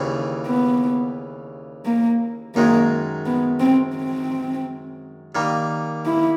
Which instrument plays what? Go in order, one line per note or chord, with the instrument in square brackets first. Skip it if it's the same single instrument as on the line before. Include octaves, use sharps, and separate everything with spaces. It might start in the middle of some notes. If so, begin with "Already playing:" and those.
Already playing: [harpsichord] D#2 C#3 E3 G3 C4
[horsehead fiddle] B3
A#3
[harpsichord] F#2 D#3 G#3 [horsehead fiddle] A#3
[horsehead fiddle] B3
C4
C4
[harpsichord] D#3 G3 A#3
[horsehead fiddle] E4